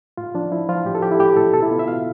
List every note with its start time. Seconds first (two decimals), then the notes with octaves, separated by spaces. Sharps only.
0.17 A2 F4
0.34 F3 D4
0.52 F3 E4
0.69 F3 F4
0.85 A2 G4
0.95 A4
1.02 F3 G4
1.12 E4
1.20 A2 G4
1.36 A2 A4
1.54 B2 A4
1.62 E4
1.70 B2 F4
1.79 E5
1.87 B2 F5